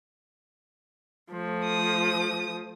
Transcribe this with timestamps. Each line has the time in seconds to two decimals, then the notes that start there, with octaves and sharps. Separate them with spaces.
1.31 F3 A3
1.65 D#6